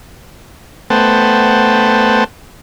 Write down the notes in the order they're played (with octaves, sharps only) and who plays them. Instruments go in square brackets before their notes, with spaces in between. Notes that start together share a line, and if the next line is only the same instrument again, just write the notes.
[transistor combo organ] A3 B3 C5 F#5 G5 A5